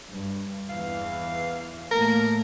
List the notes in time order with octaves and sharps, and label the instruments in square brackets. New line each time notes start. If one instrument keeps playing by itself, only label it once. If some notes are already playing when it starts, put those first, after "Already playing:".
[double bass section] G2
[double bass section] E2 E3 [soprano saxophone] F5
[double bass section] A2 A3 A#3 [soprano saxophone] A#4